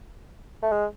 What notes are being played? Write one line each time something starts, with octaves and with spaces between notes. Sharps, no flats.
A3
G#3